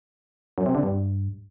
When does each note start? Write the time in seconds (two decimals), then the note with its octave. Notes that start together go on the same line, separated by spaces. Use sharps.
0.58 F#2
0.66 C3
0.75 D3
0.83 G2